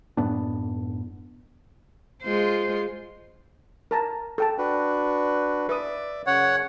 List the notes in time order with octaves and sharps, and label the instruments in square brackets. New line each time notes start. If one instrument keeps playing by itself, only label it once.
[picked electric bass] F#2 A2 B3 D4
[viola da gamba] G#3 F4 C5
[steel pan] A#4 A5 A#5
A4 G5 A5
[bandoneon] D4 F#4 B4
[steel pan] B4 D#6 [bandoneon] D5 E5 D6
[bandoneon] F#2 C#3 [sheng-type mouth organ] C#5 F#5